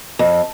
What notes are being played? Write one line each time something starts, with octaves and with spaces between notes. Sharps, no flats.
F2